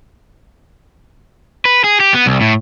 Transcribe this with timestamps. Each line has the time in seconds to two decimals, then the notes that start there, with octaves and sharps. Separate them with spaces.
1.65 B4
1.84 G#4
2.00 G4
2.14 B3
2.26 C2
2.41 A2